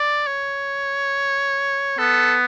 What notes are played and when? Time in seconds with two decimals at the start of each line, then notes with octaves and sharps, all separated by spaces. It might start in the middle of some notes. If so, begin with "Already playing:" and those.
Already playing: D5
0.27 C#5
1.98 B3 A4